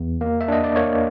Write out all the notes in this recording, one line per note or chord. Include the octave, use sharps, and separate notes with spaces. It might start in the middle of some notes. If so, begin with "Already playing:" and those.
Already playing: E2
A#3
E5
D4 D#5
D5
A#3 C#5